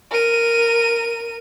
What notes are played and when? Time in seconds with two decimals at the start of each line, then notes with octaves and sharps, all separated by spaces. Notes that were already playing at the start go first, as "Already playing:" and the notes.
0.11 A#4 D#7